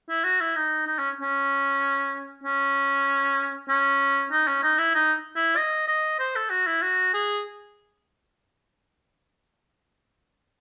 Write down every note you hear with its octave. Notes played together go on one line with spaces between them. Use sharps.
E4
F#4
E4
D#4
D#4
C#4
C#4
C#4
C#4
D#4
C#4
D#4
E4
D#4
E4
D#5
D#5
C5
A4
F#4
E4
F#4
G#4